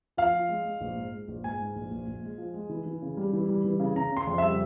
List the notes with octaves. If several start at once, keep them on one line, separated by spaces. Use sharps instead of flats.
F3 F5
F3
G#3
G#3
A#1
G#2
G#3
A#1
G#2 G#5
G#2
A#1
A#1
A#1
G#3
F3
G#3
E3
E3
C#3
G3
E3
G3
E3
C#3
C#3 A#5
C#3 C6
F2
G3 E5